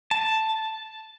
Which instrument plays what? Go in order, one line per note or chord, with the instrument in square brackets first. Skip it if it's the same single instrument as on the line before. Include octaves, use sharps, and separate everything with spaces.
[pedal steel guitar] A5